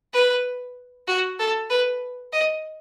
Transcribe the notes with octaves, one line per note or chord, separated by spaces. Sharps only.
B4
F#4
A4
B4
D#5